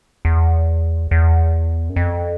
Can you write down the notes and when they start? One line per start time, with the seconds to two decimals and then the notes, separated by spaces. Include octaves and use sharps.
0.25 E2
1.11 E2
1.89 F#2
1.96 F2